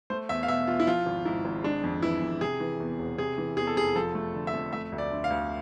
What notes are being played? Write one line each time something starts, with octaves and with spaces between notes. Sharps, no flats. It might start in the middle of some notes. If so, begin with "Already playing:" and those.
A3 C5
E2 E5
F5
B2 E5
E2 F4
E4
F3 F4
G#1
G#2 E4
G#1
G#3 D4
F2
E3 E4
F2
C3 G#4
E3
E2
E1
C3 G#4
E3
E2 G#4
A4
F1 G#4
F3 A4
A3
D3
E5
F2
A3 E5
D2
D5
D3
F5
D2